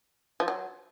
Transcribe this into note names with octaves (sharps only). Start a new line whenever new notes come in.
F3
F#3